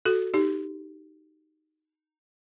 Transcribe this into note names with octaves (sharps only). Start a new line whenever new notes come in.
F#4 A4
D#4 G4